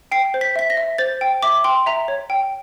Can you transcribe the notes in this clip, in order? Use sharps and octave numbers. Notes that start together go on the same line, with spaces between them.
G5 C7
C5
B6
E5 B6
A#6
E5
C5 A6
G5
E5 D6
G5 C6
E5 A#5
C#5
G5